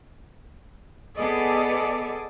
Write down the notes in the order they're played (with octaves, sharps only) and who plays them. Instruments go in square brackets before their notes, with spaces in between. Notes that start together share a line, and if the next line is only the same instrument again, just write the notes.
[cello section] B3 G#4 A4 D5 D#5